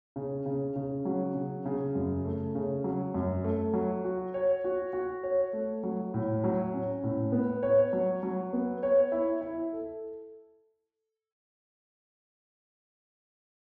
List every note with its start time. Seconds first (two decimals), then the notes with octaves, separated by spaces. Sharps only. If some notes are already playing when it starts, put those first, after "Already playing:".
0.16 C#3
0.46 C#3
0.76 C#3
1.05 F#3
1.34 C#3
1.65 C#3
1.95 F#2
2.25 A3
2.55 C#3
2.84 F#3
3.14 F#2
3.44 A3
3.74 F#3
4.04 F#4
4.34 C#5
4.64 F#4
4.93 F#4
5.23 C#5
5.53 A3
5.83 F#3
6.14 A2
6.44 F#3
6.74 C#4
7.04 A2
7.32 B3
7.63 C#5
7.93 F#3
8.23 F#3
8.53 B3
8.83 C#5
9.12 E4
9.41 E4
9.73 A4